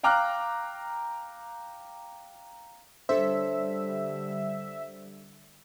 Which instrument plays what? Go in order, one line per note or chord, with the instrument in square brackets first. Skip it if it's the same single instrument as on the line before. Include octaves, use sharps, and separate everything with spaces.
[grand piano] F5 G5 A#5 D6 F6 F#6
[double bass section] D3 G3 [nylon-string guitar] D4 A4 C#5 [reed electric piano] C5 [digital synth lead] E5